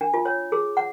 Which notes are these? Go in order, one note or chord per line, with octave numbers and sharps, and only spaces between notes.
D4
F4
C#5
G#4
F#5